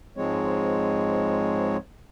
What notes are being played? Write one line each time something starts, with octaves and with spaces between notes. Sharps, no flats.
G#2 F3 G#3 C4 C#5